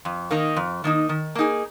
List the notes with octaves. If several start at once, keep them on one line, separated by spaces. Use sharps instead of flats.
F2
D#3 A#3 D#4
F2
D#3 A#3 D#4
D#3
A#3 D#4 G#4